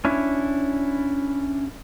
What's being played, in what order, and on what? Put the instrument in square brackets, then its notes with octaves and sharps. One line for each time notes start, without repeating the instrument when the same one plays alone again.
[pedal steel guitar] C#4 D4 E4